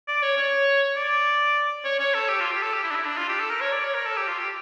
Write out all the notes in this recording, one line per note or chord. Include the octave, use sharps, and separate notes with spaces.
D5
C#5
C#5
D5
C#5
C#5
A4
G4
F4
G4
A4
G4
E4
D4
E4
D4
F4
G4
A4
A#4
C#5
D5
C#5
A#4
A4
G4
F4
G4